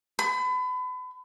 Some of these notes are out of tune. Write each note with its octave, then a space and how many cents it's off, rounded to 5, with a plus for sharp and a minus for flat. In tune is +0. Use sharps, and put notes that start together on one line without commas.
B5 +35